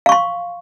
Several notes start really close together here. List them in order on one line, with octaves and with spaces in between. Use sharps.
F5 C#6 C6